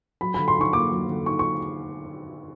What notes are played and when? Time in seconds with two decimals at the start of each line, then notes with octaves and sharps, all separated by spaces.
0.21 F#3 B5
0.34 D3 B5
0.48 C6
0.56 D#4 C#6
0.73 A#3 D6
0.91 F#3
1.09 D3
1.26 D#4 C#6
1.39 C#6